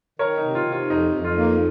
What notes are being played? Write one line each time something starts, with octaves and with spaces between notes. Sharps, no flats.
D#3 A#4 C#5
D#4
C3
F4
C3
F4
F2 D#4
F2
F4
A#3